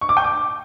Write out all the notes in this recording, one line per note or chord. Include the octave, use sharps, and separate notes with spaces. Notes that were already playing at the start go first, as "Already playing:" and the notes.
C#6
D6
G5
D6